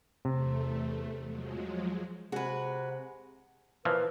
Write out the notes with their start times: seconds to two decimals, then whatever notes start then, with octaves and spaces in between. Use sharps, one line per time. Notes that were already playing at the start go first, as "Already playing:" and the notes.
0.25 E2 C3 A3
1.25 F3 F#3 G#3
2.32 C3 G#3 F#4 B4
3.85 A#2 E3 F3 B4